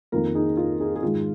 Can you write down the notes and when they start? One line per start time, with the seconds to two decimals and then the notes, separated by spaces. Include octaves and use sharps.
0.12 F2 D#3 A#3 F4 A#4
0.35 D#4 G#4
0.57 F4
0.80 D#4 G#4
0.96 G#4
1.03 G#2 D#3 G#3 F4